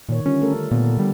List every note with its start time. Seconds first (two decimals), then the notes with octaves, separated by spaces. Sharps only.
0.09 A#2 D#3 C#5
0.26 D3 G3 C#4 F4
0.41 A3 A4 A#4
0.71 A#2 B3
0.99 D3 G3